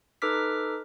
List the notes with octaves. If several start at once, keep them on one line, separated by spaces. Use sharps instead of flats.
D#4 A4 B4 D6 F6 B6